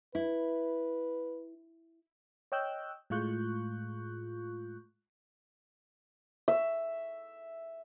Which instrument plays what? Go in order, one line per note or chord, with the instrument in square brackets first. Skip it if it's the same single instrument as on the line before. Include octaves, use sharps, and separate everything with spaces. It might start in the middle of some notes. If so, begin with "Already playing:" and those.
[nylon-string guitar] E4 [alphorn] B4
[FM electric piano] C#5 D#5 G5 E6 F#6 G6
A2 G#3 F4 C#6 F#6 G6
[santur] E5